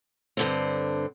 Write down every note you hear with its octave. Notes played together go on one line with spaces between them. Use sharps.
G2 D3 C4